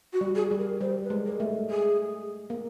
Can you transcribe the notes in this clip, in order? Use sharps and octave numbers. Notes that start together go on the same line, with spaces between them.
F#4
G3
G#4
G3
A#4
G3 C5
B4
G#3
A#4
A3
G#4
A#3